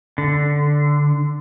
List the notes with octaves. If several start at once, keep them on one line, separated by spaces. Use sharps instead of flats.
D3